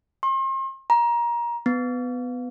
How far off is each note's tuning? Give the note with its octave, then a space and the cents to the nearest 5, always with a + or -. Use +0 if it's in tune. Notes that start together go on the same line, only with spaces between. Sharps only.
C6 +40
A#5 +25
B3 +15